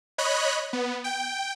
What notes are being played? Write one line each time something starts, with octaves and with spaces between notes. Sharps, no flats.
C#5 D#5 B5 F#6
B3
G5